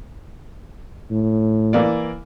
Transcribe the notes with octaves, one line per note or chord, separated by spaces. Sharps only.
A2
E3 A#3 D5